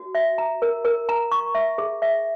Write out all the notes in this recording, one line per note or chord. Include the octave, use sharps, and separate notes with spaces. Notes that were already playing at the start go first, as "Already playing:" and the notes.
Already playing: F#4
E5
A#5
A#4
A#4
A#5
C#6
E5
G#4
E5